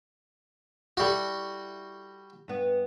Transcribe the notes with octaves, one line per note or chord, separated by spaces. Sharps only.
G3 E4 F#4 A4
G2 B3